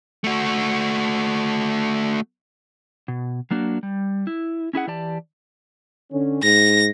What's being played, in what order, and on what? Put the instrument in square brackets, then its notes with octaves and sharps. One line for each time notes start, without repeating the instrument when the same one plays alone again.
[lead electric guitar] A3 F#4
[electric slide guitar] B2
F#3 A#3 D4 F#4
G3
E4
C#4 E4 G#4 F#5
E3 G4 D5 A5
[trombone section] D3 C#4
[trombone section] G#2 [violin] A#6